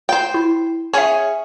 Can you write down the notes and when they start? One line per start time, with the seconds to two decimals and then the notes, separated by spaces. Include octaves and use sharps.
0.09 C5 G5
0.34 E4
0.93 C#4 G#4 C#5 E5 G#5